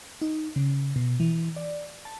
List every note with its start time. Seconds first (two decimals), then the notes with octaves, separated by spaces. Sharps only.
0.22 D#4
0.56 C#3
0.96 B2
1.20 E3
1.56 D5
2.05 A5